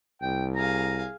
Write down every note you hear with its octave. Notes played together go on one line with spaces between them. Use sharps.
C2 G5
G#4 F5 A#5